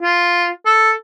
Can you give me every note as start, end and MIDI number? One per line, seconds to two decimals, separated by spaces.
0.03 0.49 65
0.66 0.92 69